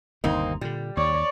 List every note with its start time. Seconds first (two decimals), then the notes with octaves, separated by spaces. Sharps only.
0.24 G1 D#2 C3 A#3 C4 D#4
0.61 A#2 D3 G3
0.97 D#2 C#5 D5